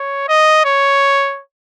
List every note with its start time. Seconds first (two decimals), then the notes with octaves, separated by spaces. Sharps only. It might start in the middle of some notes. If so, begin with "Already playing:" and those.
Already playing: C#5
0.28 D#5
0.65 C#5